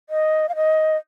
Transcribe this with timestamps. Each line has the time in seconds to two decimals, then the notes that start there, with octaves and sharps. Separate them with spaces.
0.09 D#5
0.49 F5
0.56 D#5